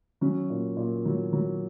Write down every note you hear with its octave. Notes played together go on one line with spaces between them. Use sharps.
F#3 C#4
A#2
A#2
F#3
F#3